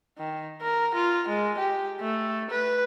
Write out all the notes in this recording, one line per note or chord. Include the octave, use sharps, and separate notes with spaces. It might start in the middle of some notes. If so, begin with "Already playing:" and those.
D#3
A#4
F4
G#3
G4
A3
B4